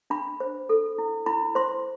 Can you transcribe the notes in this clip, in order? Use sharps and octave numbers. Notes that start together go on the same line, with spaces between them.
D4 B5
C5
A4
E4
E4 B5
C5 C6